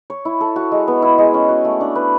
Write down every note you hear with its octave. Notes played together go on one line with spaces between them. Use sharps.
C#5
E4
A4
F#4
G#3
B3
E4
G#3
C#4
F#4
A3
D4
B4